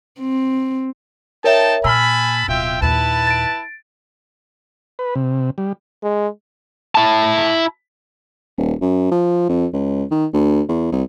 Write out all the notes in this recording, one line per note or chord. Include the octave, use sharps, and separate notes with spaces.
C4
D#4 A#4 C#5 E5 G5 A5
A#2 G#5 A5 B5 E6 F6
D1 B2 F4 E5 G5
D#2 A#2 E4 B4 A5
A6 D7
B4
C3
G3
G#3
E4 A5
D#1
F#2
F3
F2
C#2
D#3
D2
E2
C2